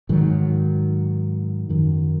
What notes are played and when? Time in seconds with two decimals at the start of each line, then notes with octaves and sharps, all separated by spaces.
0.09 G#2 D#3 F#3
1.69 F#2 D#3 F#3